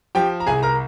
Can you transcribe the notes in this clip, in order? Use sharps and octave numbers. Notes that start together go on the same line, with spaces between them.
F3 G4 G5
A#5
C2 G#4 G#5
A#4 A#5